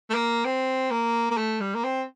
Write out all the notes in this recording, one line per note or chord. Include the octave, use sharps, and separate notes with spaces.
A3
A#3
C4
A#3
A#3
A3
G3
A#3
C4